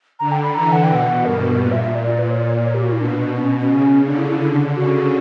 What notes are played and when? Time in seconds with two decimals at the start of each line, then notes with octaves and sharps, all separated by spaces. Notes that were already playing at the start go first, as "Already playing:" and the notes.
0.19 D3 A#5
0.32 G5
0.43 B5
0.55 E3 A#5
0.72 F#5
0.83 G5
0.90 B2
0.95 F#5
1.25 G2 A#4
1.42 A#4
1.60 A#2 B4
1.72 E5
1.83 E5
1.95 A#2 D5
2.07 D5
2.19 B4
2.31 A#2 C#5
2.39 D5
2.48 C#5
2.57 D5
2.65 C#5
2.74 G4
2.83 F#4
2.92 E4
3.01 B2 D4
3.36 D4
3.43 C#4
3.60 C#4
3.71 C#3
4.06 D3 D4
4.18 E4
4.30 E4
4.41 E4
4.53 D4
4.76 C#3 F#4